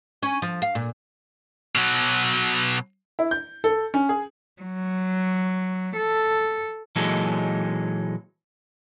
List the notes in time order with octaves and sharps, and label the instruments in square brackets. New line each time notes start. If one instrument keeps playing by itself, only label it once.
[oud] C#4
F3
F5
A#2
[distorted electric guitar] B2 F#3
[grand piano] E4
G6
A4
C#4
G#4
[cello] F#3
A4
[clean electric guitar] A#2 E3 F#3 G#3 D#4 A4